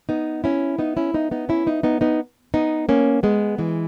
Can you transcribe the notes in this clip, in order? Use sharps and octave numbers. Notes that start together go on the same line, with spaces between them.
B3 D#4
C#4 E4
B3 D#4
C#4 E4
B3 D#4
B3 D#4
C#4 E4
B3 D#4
B3 D#4
B3 D#4
B3 D#4
A#3 C#4
G#3 B3
E3 G#3